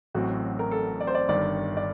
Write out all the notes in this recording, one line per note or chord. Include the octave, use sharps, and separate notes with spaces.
A1 A2 F#3 C4 F#4
A#4
A4
D5
C5
D5
G1 G2 D#3 D5
D5